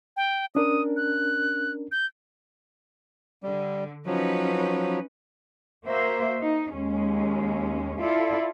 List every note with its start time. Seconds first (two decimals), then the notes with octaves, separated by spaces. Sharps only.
0.17 G5
0.55 C#4 D4 A#4 D#6
0.97 F#6
1.92 G6
3.43 D3 G3
4.06 F3 F#3 C#4 D#4 B4
5.85 A#3 F#4 C5 E5
6.39 D#4
6.72 D#2 G#3 C#4
8.00 E4 F4 A4 D5